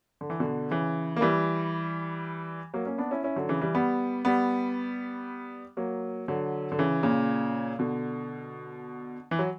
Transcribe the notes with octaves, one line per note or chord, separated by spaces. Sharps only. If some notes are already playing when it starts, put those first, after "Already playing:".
D3
E3
B2 D3
C#3 E3
A#3
E3 G3
F#3 A#3
A#3 C#4
B3 D4
C#4 E4
C#4 E4
D3 F#3
C#3 E3
E3 G3
G3 B3
G3 B3
F#3 A#3
D3 F#3
D3
C#3 E3
A#2 C#3
B2 D3
E3
F#3